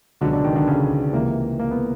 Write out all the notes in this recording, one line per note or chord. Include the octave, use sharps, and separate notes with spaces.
C#2 B2 D3 F#3 D4
D3 D4
D#3 D#4
D3 D4
C#3 C#4
C#2 C3 E3 A#3
A#3
B3